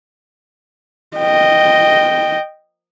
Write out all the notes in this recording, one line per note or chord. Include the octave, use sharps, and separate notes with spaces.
D#5 G5